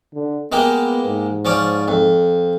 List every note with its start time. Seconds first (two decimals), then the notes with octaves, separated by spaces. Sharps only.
0.14 D3
0.52 G#3 A#3 B3 G4
1.06 G#2
1.45 F3 C#4 D5
1.88 F2